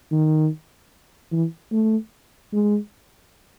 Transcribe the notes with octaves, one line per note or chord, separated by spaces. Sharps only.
D#3
E3
A3
G#3